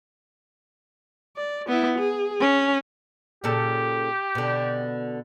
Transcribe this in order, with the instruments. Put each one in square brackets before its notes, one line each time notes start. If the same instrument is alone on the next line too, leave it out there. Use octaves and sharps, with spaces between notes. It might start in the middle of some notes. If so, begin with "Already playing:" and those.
[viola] D5
B3 E4
G#4
C#4
[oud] A#2 C#3 A4 [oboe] G4
[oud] B2 D3